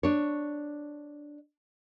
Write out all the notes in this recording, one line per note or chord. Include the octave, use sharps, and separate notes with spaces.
D4 C#5